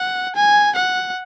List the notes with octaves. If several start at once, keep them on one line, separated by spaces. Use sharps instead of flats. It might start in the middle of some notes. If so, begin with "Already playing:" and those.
Already playing: F#5
G#5
F#5